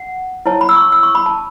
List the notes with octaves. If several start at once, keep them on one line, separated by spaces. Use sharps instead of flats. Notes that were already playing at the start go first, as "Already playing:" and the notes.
Already playing: F#5
E4 C#5 A5
B5
E6
C#6
E6
C#6
B5
A5